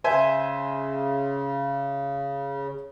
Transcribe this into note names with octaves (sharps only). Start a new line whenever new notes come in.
C#3 C5 E5 G#5